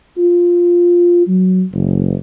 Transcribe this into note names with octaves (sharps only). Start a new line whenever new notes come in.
F4
F#3
F#1